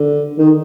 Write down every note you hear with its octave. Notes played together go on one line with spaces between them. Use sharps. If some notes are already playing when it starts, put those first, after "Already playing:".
Already playing: D3
D#3